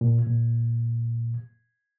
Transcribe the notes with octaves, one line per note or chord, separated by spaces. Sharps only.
A#2
A#2